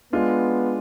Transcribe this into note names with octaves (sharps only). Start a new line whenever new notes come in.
G#3 B3 D4 F4